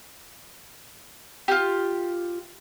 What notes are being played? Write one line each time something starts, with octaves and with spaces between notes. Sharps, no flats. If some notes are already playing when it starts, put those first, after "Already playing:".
F4 G4